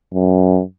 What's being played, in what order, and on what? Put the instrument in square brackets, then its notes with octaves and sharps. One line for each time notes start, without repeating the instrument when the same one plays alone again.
[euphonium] F#2